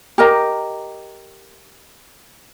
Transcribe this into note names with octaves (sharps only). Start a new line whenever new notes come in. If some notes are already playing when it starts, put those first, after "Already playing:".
G4 A#4 D#5 A#5